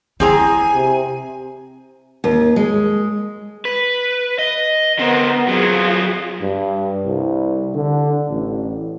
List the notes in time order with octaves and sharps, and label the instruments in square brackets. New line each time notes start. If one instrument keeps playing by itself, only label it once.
[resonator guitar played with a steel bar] C4 G#4 A#5 [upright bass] E4 [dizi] G#5
[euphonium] C3
[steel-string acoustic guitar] D#2
G#3
[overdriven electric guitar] B4
D#5
[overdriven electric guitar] D3 C4 [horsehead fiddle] B3 A#4
[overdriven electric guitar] F#3 C4 [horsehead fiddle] F4 G#4
[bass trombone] G2
C2
D3
A1